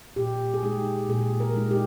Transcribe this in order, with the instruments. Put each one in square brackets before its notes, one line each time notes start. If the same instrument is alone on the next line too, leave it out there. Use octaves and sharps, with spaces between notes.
[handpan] A#2 G4
G#4
G#3 D#4 G4
A#2 G#4
A#4
G#3 D#4
G4